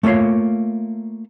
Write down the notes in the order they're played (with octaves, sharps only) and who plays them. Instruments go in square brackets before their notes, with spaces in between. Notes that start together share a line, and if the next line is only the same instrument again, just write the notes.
[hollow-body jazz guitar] A3 A#3 F4 C#5 F5